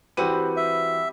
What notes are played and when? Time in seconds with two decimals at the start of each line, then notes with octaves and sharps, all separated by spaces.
0.17 E3 G3 C4 F#4 B4 C5 F#5 D#7
0.57 E5